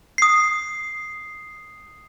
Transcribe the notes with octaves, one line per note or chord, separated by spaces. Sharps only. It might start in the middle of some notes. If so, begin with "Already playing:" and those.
D#6 C7